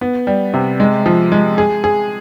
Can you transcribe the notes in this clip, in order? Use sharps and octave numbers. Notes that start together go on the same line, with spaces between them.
B3
G3
C3
G#3
F3
G#3
G#4
G#4